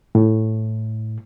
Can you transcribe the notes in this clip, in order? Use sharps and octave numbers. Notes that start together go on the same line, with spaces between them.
A2